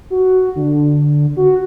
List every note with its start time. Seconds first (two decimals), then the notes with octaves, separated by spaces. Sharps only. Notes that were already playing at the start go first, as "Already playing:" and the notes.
0.10 F#4
0.55 D3
1.37 F#4